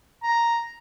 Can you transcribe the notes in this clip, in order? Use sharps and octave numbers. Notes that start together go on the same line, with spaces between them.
A#5